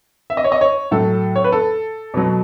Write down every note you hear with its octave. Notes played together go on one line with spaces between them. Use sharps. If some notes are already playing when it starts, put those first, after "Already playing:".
E5
D#5
C#5
D#5
C#5
A2 F#3 A4
C#5
B4
A4
B2 F#3